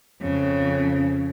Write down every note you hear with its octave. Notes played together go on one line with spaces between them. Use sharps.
F2 C#3